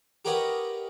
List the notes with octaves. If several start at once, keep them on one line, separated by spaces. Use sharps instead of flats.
G4 A#4 B4 C#5 D#5 F#5